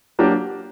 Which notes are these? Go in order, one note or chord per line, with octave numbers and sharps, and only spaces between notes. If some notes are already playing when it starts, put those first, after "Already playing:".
F#3 A#3 D4 G4